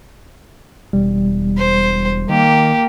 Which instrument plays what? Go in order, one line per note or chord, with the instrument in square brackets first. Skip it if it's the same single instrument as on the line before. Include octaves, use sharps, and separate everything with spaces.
[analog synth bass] E1 [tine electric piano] G3
[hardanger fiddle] C5
[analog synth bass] D#3 [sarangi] A#3 [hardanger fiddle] G4